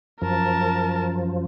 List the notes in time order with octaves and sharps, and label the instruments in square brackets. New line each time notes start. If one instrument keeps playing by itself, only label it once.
[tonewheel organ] F#2 F3 [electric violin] A#4 A5